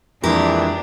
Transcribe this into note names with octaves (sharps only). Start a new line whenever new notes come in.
F2 A#2 E3 G#3 D4 G4 A#4